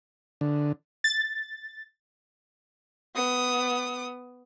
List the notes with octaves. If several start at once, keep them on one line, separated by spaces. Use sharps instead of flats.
D3
A6
B3 D#6